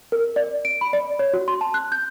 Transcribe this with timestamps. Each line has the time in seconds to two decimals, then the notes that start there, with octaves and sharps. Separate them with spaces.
0.12 A#4
0.36 D5
0.65 D7
0.81 B5
0.93 D5
1.19 C#5
1.33 F#4
1.48 C6
1.61 A5
1.74 F#6
1.92 G6